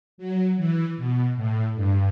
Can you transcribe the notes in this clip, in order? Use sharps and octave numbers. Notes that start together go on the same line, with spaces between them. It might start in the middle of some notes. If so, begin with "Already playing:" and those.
F#3
E3
B2
A2
G2